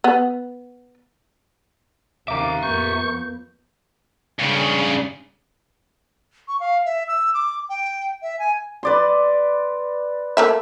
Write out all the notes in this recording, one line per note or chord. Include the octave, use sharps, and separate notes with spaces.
B3
D#2 C3 D#3 E5 F5 A#5 D6
F2 A#3 B3 C#6 G6
G2 C#3
C#6
F5
E5
E6
D6
G5
E5
G#5
B4 D5 C6
A3 A#3 E5